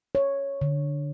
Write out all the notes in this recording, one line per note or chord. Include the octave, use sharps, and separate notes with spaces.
C#5
D3